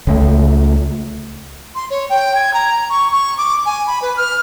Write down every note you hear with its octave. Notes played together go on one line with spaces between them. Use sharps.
C#2 A3
C6
C#5
G5
G#6
A#5
C#6
C#6
D6
G#5
B5
B4
F6